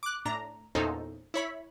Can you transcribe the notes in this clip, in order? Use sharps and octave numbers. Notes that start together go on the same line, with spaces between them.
D6 F#6
A2 D4 A#5
E2 A#2 C#4 D#4 A4 C5
E4 C#5 B5